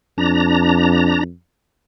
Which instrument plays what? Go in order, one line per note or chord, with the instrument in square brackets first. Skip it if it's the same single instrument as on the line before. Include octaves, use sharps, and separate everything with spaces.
[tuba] F2 [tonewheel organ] D4 A#5